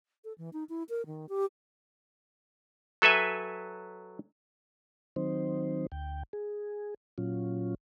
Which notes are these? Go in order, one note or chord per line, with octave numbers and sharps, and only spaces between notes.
A4
E3
D#4
E4
A#4
D#3
G4
F#3 A4 B4 E5 G#5
D#3 F#3 C4 D#4 C5
D2 G5
G#4
A#2 F#3 C#4 F4